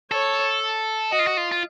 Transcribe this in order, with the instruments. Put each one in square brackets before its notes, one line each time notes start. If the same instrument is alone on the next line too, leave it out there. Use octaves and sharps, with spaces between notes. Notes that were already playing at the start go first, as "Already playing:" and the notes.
[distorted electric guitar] A4 [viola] C#5
[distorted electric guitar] F#4 [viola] D#5
[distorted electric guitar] F4
F#4
F4
F4